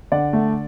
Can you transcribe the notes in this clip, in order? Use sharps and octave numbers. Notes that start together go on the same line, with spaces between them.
D3 D5 F#5
A3